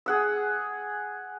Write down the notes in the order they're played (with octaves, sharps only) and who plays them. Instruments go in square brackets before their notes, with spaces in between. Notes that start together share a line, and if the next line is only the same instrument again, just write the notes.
[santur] G#4 F#5 E6